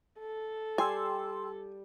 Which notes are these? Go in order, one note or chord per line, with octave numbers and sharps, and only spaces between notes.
A4
G3 G5 G#5 C6 E6